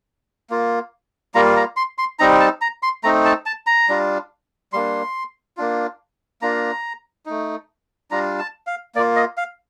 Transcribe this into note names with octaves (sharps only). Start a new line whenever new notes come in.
A#3 F4
G3 A#3 F4 A#5
A#5
C6
C6
G3 C4 D#4 A#5
A5
A#5
C6
A3 C4 D#4 A#5
A5
A5
A#5
G3 D4 F4
G3 A#3 D4 C6
A#3 D4 F4
A#3 D4 F4 A#5
A3 D#4
G3 D4 F4 A#5
A5
F5
A#3 F4 D5
D#5
F5